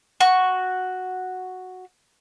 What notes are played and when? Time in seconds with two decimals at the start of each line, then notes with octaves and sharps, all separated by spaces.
0.20 F#4 C#6